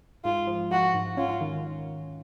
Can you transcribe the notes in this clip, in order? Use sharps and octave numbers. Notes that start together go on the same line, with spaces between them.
G#2 F4
F3
F3 F#4
G#2
C#4 F4
D#3